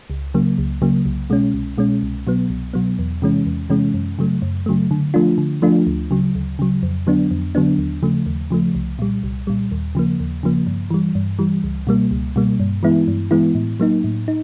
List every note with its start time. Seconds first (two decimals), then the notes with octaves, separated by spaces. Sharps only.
0.10 C#2
0.34 C#3 F#3 A#3
0.58 C#2
0.82 C#3 F#3 A#3
1.05 C2
1.30 B2 G#3 C#4
1.54 C2
1.78 B2 G#3 C#4
2.03 C2
2.27 B2 F#3 B3
2.50 C2
2.73 B2 F#3 B3
2.99 E2
3.22 C3 E3 G#3 C#4
3.46 E2
3.70 C3 E3 G#3 C#4
3.94 F#2
4.19 C#3 F#3 A3
4.42 F#2
4.66 C#3 F#3 A3
4.91 D3
5.14 F3 A3 D4 F4
5.38 D3
5.62 F3 A3 D4 F4
5.87 D2
6.11 C#3 F#3
6.35 D2
6.59 C#3 F#3
6.83 F2
7.07 D3 F#3 B3 D4
7.31 F2
7.55 D3 F#3 B3 D4
7.78 D#2
8.03 C#3 F3 A3
8.26 D#2
8.50 C#3 F3 A3
8.75 C2
8.99 A#2 G3
9.23 C2
9.47 A#2 G3
9.71 D#2
9.95 C#3 F3 A#3
10.20 D#2
10.43 C#3 F3 A#3
10.66 G2
10.90 E3 G3
11.15 G2
11.39 E3 G3
11.64 C#2
11.87 B2 G3 A#3
12.11 C#2
12.36 B2 G3 A#3
12.60 G2
12.83 E3 G#3 B3 E4
13.08 G2
13.31 E3 G#3 B3 E4
13.55 A2
13.80 F#3 A#3 D#4
14.04 A2
14.28 D#4